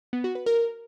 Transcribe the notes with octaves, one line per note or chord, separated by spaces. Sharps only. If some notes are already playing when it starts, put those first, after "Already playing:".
B3
F#4
B4
A#4